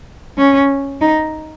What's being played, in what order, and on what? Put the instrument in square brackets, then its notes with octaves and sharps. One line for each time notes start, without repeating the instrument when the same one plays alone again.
[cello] C#4
D#4